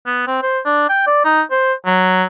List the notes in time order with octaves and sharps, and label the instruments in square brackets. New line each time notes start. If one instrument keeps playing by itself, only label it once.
[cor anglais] B3
C4
C5
D4
G5
D5
D#4
C5
F#3